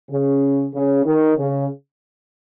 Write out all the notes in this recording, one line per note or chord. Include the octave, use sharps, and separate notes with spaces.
C#3
C#3
D#3
C#3